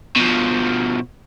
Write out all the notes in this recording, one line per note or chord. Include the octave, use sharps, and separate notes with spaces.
B2 F3